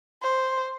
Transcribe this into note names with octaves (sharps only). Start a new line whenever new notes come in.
C5